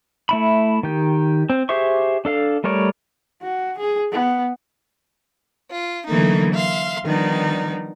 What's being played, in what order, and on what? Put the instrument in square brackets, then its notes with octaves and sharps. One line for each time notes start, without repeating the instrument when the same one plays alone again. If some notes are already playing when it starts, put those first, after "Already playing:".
[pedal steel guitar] A3 E4 B5
D#3 G4
C4
G4 G#4 C5 E5 C#6
D4 A4 F5
G3 A3 A#4 C#5 D5
[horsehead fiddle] F#4
G#4
B3
[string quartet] F4
D3 E3 F#3 A3 A#3 D#4
E5 F5 C6
D#3 F3 G3 B3 D4 D#4